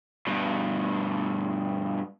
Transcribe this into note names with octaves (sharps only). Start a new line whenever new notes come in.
G2 B2